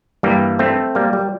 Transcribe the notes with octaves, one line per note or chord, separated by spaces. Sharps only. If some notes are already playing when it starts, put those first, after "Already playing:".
G2 E3 G3 A#3
A3 C4
G3 A#3
G3